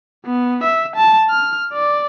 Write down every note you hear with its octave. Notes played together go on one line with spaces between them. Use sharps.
B3
E5
A5
F6
D5